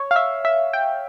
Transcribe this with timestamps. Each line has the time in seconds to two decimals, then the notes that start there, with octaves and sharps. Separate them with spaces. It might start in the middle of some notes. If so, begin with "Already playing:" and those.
Already playing: C#5
0.11 F5
0.16 E5
0.45 E5
0.73 G5